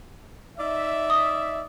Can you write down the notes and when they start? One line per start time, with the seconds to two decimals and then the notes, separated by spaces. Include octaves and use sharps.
0.58 D#4 D5 E5
1.10 D#6